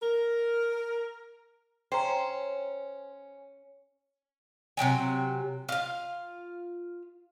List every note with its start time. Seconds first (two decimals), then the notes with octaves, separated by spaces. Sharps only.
0.02 A#4
1.92 C#4 C5 G5 A#5
4.77 C3 F#3 G5 G#5
5.69 F4 F5